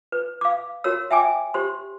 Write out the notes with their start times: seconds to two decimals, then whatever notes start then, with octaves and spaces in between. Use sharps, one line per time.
0.12 B4
0.41 F5 D6
0.84 F#4 A#4 C#5 E6
1.11 E5 G5 G#5 D6
1.54 G4 C5 C6